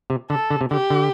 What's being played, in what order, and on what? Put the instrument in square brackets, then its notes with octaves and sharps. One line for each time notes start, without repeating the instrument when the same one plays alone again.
[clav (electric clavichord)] C3
[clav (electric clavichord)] D3 [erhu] A4
[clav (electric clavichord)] D3
C3
[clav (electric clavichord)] D3 [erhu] G4
[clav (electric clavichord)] D3